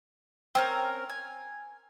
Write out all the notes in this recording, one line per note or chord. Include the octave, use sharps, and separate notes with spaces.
C4 C#4 A#4 G5
G#5